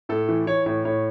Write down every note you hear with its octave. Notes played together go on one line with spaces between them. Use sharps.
A2 A4
E3
E3 C#5
A2 C#5
A2 C#5